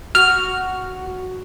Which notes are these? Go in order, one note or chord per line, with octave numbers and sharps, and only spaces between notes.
F#4 F6